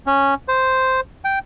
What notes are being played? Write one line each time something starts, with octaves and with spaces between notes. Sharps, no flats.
C#4
C5
G5